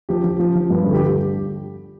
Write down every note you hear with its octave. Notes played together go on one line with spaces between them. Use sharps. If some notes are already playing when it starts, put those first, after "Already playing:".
F3 G4
F3
F3
F3
G2
D3
G4